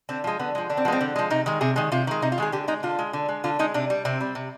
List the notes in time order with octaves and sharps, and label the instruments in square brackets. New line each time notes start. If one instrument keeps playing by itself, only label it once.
[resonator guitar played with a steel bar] D3 C4
F3 G#3
D3 B3
F3 G#3
D3 D4
C4
F3 B3
G#3 C4
D3
F3 G#3
C3 D#4
D#3 G#3
C3 G#4
D#3 G#3
C3 F4
D#3 G#3
C3 D#4
F4
D#3 G#3 G#4
D3 G4
G#3 D#4
D3 F4
G#3
D3
G#3
D3 F4
G#3 D#4
C3 D4
G3
C3 C4
G3
C3